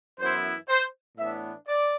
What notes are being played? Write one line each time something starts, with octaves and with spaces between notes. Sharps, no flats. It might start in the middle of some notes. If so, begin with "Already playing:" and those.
F#2 E3 B3 E4 C5
C5
A2 E3 B3 D4 E5
D5